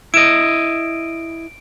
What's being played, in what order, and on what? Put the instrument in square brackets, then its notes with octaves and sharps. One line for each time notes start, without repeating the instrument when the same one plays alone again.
[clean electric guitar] E4 D#5 [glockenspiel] D7